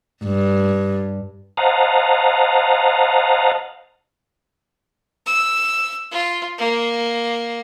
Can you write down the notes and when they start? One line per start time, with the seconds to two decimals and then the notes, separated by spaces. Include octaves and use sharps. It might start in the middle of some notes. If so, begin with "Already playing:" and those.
0.24 G2
1.57 C5 D#5 F5 F#5 A5 A#5
5.26 E6
6.11 F4
6.58 A#3